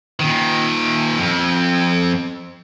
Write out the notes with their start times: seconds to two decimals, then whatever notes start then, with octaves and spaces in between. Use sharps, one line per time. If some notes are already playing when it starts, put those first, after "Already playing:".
0.20 A#2 D#3
1.18 F2